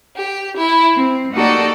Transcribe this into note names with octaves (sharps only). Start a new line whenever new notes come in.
G4
E4
C4
A#3 D#4 F#4 G4 A4 D5